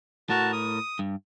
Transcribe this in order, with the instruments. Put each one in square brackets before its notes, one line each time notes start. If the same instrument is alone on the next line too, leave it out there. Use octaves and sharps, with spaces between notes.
[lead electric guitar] A2 A#4 [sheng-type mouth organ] F#4 A5
[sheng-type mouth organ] D#6
[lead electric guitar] G2